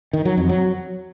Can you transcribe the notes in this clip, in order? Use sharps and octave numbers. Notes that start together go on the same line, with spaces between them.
D#3
F#3
F2
F#3